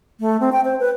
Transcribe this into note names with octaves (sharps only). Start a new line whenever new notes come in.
A3
C4
G5
C5
B4